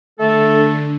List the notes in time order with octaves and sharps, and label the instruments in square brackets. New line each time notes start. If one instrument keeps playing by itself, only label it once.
[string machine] D3 [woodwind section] A3 A4